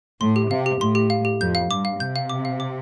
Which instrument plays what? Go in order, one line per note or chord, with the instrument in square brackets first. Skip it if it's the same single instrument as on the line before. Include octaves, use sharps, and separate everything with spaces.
[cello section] A2 [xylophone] C6
[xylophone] G4
[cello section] C3 [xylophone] F5
[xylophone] G4
[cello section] A2 [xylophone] C6
[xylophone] G4
F5
G4
[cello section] F2 [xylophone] G6
[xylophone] F5
[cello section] G2 [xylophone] D6
[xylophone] F5
[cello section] C3 [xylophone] G6
[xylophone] F5
D6
F5
D6